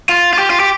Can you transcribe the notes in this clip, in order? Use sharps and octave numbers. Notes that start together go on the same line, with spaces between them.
F4
F4
G4
F4
G4